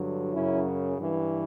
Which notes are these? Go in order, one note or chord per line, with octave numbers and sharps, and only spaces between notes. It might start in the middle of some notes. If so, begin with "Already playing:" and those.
Already playing: G2 D3 F#3
F#2 C#3 F#3 C#4 E4
G2 E3